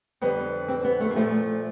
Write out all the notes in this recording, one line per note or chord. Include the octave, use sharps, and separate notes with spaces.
F2 D3 G3 B3
C4
B3
A3
A#3
A#2 F3 A3